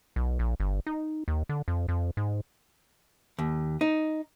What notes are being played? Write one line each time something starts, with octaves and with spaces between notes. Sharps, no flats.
B1
A#1
G1
D#4
D#2
D3
F2
F2
G#2
D#2
D#4